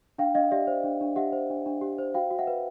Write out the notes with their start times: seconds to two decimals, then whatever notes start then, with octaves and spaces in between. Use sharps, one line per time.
0.18 D4 F5 G5
0.35 D4 D#5 F5
0.51 G4 D5 E5
0.67 C5
0.84 D4
1.01 D4
1.16 G4 E5 F#5
1.32 C5
1.50 D4
1.66 D4
1.81 G4
1.98 C5
2.14 F#4 F5 G5
2.31 F#4
2.39 E5 F#5
2.47 B4